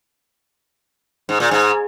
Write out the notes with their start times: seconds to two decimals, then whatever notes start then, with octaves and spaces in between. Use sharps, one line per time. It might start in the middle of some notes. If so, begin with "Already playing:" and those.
1.29 G#2
1.40 A#2
1.51 G#2